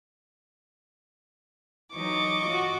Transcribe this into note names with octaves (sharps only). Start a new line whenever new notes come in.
E3 F#3 D#4 D#5 C#6 D6
F4 F#4